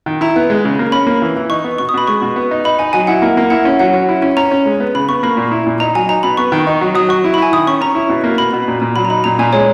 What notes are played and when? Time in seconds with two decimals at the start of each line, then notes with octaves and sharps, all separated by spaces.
0.06 D#3
0.21 E4 A#5
0.36 B3
0.50 G#3
0.65 C#3
0.79 A#3
0.92 C#4 B5
1.07 A#3
1.22 E3
1.36 E3
1.50 D#4 C#6
1.64 B3
1.78 B2 C#6
1.89 D#6
1.94 B2 B5
2.07 G#3 C#6
2.22 B2
2.36 B3
2.51 D#4
2.65 D#4 B5
2.79 D#4 G#5
2.93 F#3 G#5
3.07 E4 F#5
3.22 A#3
3.37 A#3
3.50 E4 F#5
3.65 C#4
3.79 F#3 F#5
3.94 C#4
4.09 E4
4.22 C#4
4.37 C#4 A#5
4.51 C#4
4.66 G#3
4.80 B3
4.95 C#3 B5
5.09 B3 C#6
5.23 A#3 B5
5.37 A#2
5.51 E4
5.67 A#2
5.80 D#4 A#5
5.95 F#3 G#5
6.09 D#4 A#5
6.23 B2 B5
6.37 B3 C#6
6.52 D#3
6.67 D#4
6.81 F#3
6.95 F#3 D#6
7.09 F#3 C#6
7.24 E4
7.34 B5
7.38 E4 G#5
7.52 D#3 D#6
7.67 C#4 C#6
7.81 C#4 A#5
7.95 E4
8.09 B2
8.24 A#3
8.38 B2 B5
8.53 B2
8.68 A#2
8.82 A#2
8.96 F#3 B5
9.05 A#5
9.10 D#4 B5
9.24 A#2 A#5
9.39 A#2 G#5
9.53 G#3 C#5